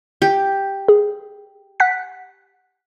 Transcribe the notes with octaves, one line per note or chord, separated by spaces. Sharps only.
G4
G#4
F#5 F#6 B6